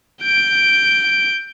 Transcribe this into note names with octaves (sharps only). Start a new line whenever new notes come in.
G6 D7